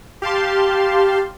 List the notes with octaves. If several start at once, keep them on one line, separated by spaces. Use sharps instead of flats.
G4 F5 A5 C6